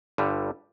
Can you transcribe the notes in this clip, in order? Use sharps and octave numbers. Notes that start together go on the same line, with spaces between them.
G1 G2 D3 G3